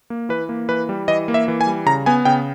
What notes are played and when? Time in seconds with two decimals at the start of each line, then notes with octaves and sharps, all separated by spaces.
0.10 A#3
0.29 E3 B4
0.49 A#3
0.69 E3 B4
0.89 G3
1.08 E3 D#5
1.28 A#3
1.34 E5
1.48 E3
1.61 G#5
1.67 G3
1.86 C#3 A#5
2.06 B3 G#5
2.25 C#3 G5